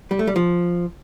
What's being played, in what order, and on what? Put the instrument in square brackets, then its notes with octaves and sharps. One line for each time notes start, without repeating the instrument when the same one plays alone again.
[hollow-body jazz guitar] G3
A3
G3
F3